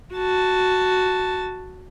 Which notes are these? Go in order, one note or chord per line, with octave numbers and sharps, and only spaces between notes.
F#4 A5